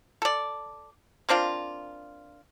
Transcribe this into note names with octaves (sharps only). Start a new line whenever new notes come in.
A4 D5
A#3 C4 D4 F4